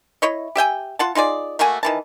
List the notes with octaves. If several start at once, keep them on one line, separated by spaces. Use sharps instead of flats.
E4 C#5 D#5
G4 E5 G5 G#5
F4 F#5 A5
D#4 F4 G#4 D5
A3 A#3 F#4 G#5
D#3 E3 A5